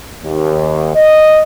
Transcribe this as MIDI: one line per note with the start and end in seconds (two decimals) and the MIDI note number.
0.23 0.92 39
0.95 1.42 75